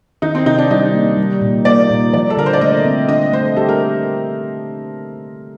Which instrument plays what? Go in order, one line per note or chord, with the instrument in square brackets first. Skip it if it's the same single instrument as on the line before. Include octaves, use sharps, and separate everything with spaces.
[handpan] D#3 [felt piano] D#4
[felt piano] C4
[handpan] C3 [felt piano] D#4
[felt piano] D4
[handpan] G3 [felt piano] D#4
[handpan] A#3
G3
A#2
[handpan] A#3 [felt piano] D5
[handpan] A#2
[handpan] F3 [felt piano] D5
[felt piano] A4
[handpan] D3 [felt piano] A#4
[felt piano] C5
D5
[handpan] A3 [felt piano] D#5
[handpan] C4
[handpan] D4 [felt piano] D#5
[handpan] A3 [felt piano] C5
[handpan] G4 [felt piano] A4
[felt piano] A#4